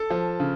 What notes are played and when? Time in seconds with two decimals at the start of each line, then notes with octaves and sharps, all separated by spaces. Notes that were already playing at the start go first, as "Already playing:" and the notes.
Already playing: A4 A5
0.10 F3
0.40 C#3